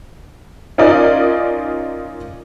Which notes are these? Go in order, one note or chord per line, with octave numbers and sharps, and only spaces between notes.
C#4 D#4 F4 A#4 D5 D#5